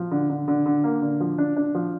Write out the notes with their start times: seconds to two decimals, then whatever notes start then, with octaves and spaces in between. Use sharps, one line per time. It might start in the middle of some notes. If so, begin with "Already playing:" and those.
Already playing: F3
0.11 D3
0.30 D3
0.48 D3
0.66 D3
0.84 A#3
1.02 D3
1.20 F3
1.38 D4
1.56 D4
1.75 F3